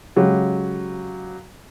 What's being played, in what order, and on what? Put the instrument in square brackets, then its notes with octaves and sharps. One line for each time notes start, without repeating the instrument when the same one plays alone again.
[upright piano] C#3 F#3 G#3 G4